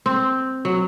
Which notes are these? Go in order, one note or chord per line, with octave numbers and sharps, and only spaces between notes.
C4
F#3